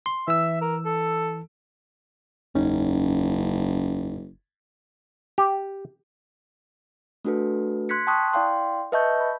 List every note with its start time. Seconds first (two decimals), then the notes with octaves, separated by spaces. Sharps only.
0.06 C6
0.28 E3 E5 E6
0.61 A#4
0.86 A4
2.55 F#1 E2 C#4 D#4
5.38 G4
7.25 A3 D4 F#4 A4 B4
7.89 C6 F#6 G#6 B6 C#7
8.07 G5 A5 C6 C#6 D#6 F#6
8.33 E4 D5 F5 G5 C6
8.92 B4 D#5 E5 A5 C#6 G6
9.20 B5